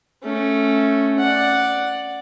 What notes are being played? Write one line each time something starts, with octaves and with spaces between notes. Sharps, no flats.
A3 C#4
D5 F#5